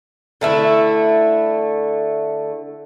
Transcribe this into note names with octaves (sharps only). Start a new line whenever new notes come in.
D3 A3 E4